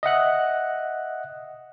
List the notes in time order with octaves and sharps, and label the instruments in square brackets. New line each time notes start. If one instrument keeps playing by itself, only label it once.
[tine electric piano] D#5 E5 F#5 F#6